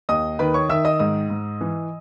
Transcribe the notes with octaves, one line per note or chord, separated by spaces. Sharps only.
D#2 D#5 D#6
D#3 B4 B5
C#5 C#6
D#3 E5 E6
D#5 D#6
G#2 D#5 D#6
G#2
E3